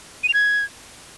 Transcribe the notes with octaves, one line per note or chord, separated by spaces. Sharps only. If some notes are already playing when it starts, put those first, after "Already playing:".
D#7
F7
G#6